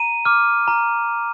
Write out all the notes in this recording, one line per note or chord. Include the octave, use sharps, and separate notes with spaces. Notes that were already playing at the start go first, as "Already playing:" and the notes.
Already playing: A#5 D#7
D6 F6
A#5